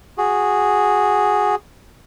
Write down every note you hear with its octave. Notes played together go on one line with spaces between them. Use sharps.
F#4 G#4